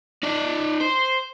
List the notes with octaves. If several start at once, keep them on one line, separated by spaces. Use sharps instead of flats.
D#4 D5
C5